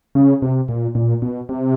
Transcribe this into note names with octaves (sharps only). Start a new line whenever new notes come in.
C#3
C3
A#2
A#2
B2
C3